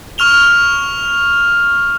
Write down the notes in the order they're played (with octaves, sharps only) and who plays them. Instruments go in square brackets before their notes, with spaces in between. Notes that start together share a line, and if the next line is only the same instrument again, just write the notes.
[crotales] C#6 F6 F7 G7